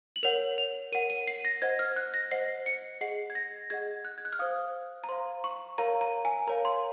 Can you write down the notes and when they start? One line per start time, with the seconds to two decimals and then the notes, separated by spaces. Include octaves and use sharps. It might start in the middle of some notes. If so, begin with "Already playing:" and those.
0.16 F#7
0.23 A#4 C#5 F#5 F7
0.58 F7
0.92 A#4 C#5 F#5 D#7
1.10 D#7
1.27 C7
1.45 A#6
1.62 C5 D#5 F#5 G#6
1.79 F6
1.96 F#6
2.14 A#6
2.31 C5 D#5 F#5 C7
2.66 C#7
3.01 G#4 D#5 F#5 C7
3.30 G#6
3.35 A#6
3.70 G#4 D#5 F#5 G#6
4.05 F#6
4.18 G#6
4.25 F#6
4.33 F6
4.39 C5 F5 D#6
5.04 A#5
5.09 C5 F5 C6
5.44 C#6
5.78 A#4 C#5 F5 A#5
6.01 A#5
6.25 G#5
6.47 A#4 C#5 F5 A#5
6.65 C6